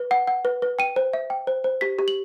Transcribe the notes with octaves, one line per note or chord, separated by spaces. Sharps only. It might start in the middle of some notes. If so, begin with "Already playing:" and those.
Already playing: B4
F#5
F#5
B4
B4
G5 D#7
C5
E5
G5
C5
C5
G4 B6
G4
F#7